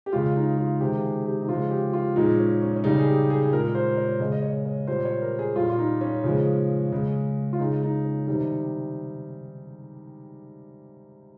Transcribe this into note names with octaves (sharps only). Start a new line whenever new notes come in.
G4
C#3 G#3 F4
D#4
F4
C3 D#3 G#3 G4
G#4
G4
D#4
C#3 F3 G#3 F4
G4
F4
A#2 F3 G#3 D#4
C#4
C#4
C#4
C#3 G3 D#4
G#4
G4
G#4
G#4
A#2 G#3 A#4
C5
C#5
C#3 G#3 D#5
D#5
C#5
C#5
A#2 G3 C5
C#5
A#4
G#4
A#2 G3 F4
F4
D#4
C#4
C#3 F3 G#3
C#3 G#3
F4
C#3 G#3 D#4
D#4
C#4
C3 D#3 G3 D#4